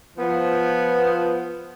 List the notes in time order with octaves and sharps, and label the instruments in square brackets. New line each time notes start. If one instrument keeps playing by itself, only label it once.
[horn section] F3 B3